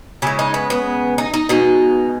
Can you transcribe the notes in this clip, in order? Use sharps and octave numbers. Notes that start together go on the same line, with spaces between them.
C#3 G#3 E4
D#4
B3
B3
D#4
D#4
B2 G#3 D#4